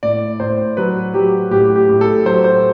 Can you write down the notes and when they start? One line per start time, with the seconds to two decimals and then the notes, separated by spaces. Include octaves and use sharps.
0.03 A2 D5
0.40 A2 C5
0.77 F#3 B4
1.14 F#3 G4
1.51 A2 G4
1.76 G4
1.89 A2
2.01 A4
2.25 F#3 C5
2.44 C5